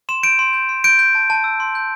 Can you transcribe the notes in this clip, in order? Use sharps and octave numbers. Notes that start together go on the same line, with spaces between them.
C6 E7
G6 D7
C6
G6
C6
G6 D7
G6
A5
A5
E6
C6
G6